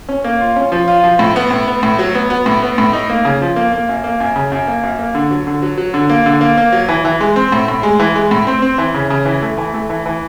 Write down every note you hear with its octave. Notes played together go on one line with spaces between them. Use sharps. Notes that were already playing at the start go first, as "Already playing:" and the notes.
C#4
A#3
F4
C#4
F3
F4
F3
A2
B3
A2
B3
A2
F#3
B3
B3
A2
B3
A2
D#4
A#3
C#3
F3
A#3
A#3
F#2
A#3
F#2
C#3
F#2
A#3
F#2
A#3
D3
F#3
D3
F#3
F#3
D3
A#3
D3
A#3
A#3
F#3
E3
E3
G#3
C4
A2
A2
G#3
E3
G#3
A2
C4
C4
E3
C#3
C#3
E3
A3
E3
A3
E3
E3